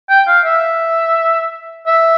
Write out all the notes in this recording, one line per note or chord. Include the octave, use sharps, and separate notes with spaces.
G5
F5
E5
E5